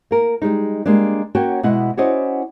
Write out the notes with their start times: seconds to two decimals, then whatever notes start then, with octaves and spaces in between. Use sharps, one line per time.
0.11 A#3 A#4
0.42 G3 G#3 D#4
0.86 G3 G#3 A#3 D4
1.35 A#3 C#4 F#4 C#5 G5
1.63 B2 G#3 B3 E4 D#5 F#5
1.97 C#4 E4 F#4 C5 D5 D#5